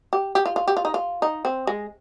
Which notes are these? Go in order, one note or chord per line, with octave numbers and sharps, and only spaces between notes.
G4
G4
F4
F4
G4
F4
D#4
F4
D#4
C4
G#3